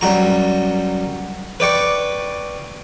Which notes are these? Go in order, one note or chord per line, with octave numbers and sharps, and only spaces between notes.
F#2 G3 F#4 A#5
B4 D5 G5 C#6